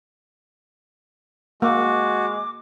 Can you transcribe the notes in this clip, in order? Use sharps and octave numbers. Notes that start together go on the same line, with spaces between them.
G#3 A#3 F#4 D6